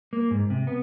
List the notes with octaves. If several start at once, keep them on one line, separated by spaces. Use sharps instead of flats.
A#3
G#2
C3
B3